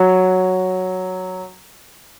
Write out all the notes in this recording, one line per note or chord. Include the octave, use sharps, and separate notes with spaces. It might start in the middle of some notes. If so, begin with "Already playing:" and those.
Already playing: F#3